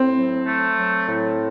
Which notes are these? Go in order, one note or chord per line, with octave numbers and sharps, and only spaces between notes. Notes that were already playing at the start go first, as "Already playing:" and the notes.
Already playing: A2 C4
F#3
A3
F#3
A2